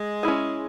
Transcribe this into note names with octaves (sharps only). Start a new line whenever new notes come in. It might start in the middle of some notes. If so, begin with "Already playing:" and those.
Already playing: G#3
C#4 E4 G#4